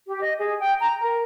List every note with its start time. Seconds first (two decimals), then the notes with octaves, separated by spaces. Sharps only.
0.08 G4
0.22 D#5
0.38 G#4
0.61 G5
0.81 A#5
1.02 A#4